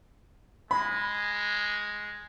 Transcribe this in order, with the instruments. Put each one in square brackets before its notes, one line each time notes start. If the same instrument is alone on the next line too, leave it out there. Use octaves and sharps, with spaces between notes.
[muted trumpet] G#3 [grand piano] B5